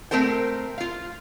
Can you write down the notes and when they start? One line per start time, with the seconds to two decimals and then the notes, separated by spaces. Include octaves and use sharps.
0.11 A3 C4 A#4 C5 G5
0.78 F4 F5